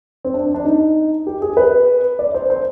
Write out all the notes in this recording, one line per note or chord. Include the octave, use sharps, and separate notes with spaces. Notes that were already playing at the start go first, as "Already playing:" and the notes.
C4
D4
D4
D#4
G4
G#4
B4
D5
C5
C5